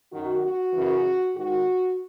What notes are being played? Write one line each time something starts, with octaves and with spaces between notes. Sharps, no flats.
F#2 D#3 F#4
F#4
F#2 C#3 E3
G#2 D#3 F#4